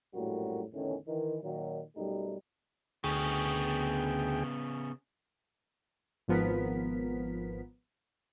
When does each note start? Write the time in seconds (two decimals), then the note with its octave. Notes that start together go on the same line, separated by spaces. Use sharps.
0.15 A#1 F#2 A2 G3 F#4 A#4
0.74 E2 A2 D3 D#3 C#4
1.08 D#3 E3
1.43 A#2 D#3 F#3
1.96 B1 F#2 G3 A3 D#4 G4
3.04 D2 C#3 B3 G#4 G5
6.28 G#1 F3 B3 A#4 B6